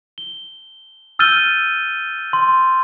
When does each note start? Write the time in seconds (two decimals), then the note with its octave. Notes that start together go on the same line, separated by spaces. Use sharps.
0.18 G7
1.19 E6 F6 G6 A6 D#7 G7
2.33 C6